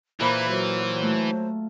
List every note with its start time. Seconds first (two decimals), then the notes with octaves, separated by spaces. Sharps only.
0.20 A#2 E3 A#4 C5 E5 B5
0.49 F#3 F4 A#4 C5
1.03 A3